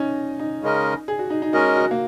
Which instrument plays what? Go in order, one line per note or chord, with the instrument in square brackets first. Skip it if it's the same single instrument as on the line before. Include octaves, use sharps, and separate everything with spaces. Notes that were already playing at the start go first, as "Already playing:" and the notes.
Already playing: [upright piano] C#4 D#4
D#4
[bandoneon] C#3 G#3 C#4 A#4 D#5
[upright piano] G#4
F#4
D#4
D#4
[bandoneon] G#3 C#4 A#4 D#5 [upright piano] F#4
[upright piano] F#4
A#3